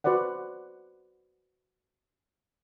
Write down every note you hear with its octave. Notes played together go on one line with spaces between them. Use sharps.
F#4 B4 C5 D5 F#5